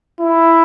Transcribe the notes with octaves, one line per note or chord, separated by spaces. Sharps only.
E4